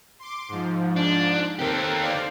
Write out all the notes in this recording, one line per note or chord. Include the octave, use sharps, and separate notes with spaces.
C6 D6
G#2 F3
D4
D#3 C4 G4 A4 A#4
C5 D5 F5